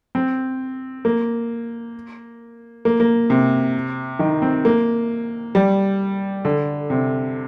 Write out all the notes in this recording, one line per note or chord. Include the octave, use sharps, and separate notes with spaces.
C4
A#3
A#3
A#3
C3
D#3
C4
A#3
G3
D3
C3